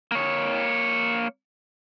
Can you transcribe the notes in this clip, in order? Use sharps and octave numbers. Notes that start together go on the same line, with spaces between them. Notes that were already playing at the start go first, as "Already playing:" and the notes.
A#3 C#5